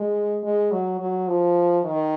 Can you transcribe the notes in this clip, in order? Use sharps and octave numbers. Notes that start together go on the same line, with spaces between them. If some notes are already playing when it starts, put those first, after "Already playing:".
Already playing: G#3
G#3
F#3
F#3
F3
D#3